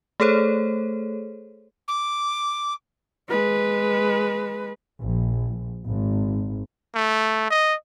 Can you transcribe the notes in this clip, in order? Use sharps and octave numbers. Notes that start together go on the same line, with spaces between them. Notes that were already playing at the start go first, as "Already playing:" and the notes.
A3 G#4 A4 C5 C#5
D6
G#3 B4
A#1
G#1
A3
D#5